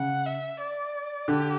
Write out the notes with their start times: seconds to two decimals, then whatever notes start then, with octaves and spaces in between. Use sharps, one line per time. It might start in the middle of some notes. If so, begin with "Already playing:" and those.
Already playing: C#3 F#5
0.26 E5
0.60 D5
1.28 D3 G4